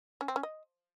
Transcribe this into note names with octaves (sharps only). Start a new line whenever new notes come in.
C#4
C4
C#4
D#5